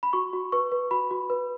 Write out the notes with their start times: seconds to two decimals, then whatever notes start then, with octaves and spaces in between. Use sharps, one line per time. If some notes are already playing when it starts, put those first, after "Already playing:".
0.03 B5
0.13 F#4 C#6
0.33 F#4
0.52 B4 C#6
0.72 B4
0.91 F#4 B5
1.11 F#4
1.30 B4